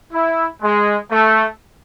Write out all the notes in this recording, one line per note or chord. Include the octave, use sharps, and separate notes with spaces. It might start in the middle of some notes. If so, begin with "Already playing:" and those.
E4
G#3
A3